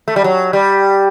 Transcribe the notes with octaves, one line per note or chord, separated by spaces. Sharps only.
A3
G3
F#3
G3